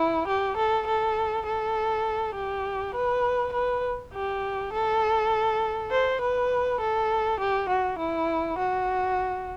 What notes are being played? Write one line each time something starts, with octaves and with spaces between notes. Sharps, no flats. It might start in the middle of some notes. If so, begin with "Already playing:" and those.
Already playing: E4
G4
A4
A4
A4
G4
B4
B4
G4
A4
C5
B4
A4
G4
F#4
E4
F#4